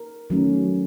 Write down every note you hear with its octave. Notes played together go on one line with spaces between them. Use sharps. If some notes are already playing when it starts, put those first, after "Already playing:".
Already playing: A#4
D#3 F#3 A3 C#4